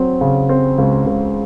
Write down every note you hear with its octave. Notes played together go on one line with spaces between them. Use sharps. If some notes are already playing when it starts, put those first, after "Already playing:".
Already playing: F#3 C4
C#3
C4
C#2
C#2